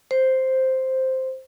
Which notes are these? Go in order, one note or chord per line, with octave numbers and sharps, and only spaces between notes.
C5